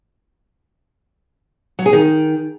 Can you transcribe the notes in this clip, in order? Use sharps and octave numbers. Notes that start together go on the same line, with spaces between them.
F#3
G#4
D#3